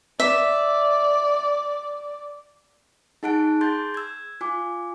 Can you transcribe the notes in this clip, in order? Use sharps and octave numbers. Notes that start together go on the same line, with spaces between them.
D5 E5
D#4 G#4 F#5 A5 F#6 D7
G#4 C6 G6 A6
E6 G#6
F4 G#5 D6